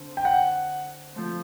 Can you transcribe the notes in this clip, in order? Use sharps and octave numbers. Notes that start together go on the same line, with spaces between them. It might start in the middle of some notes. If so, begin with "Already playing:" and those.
Already playing: D3 C4
G5
F#5
F3 A3 C4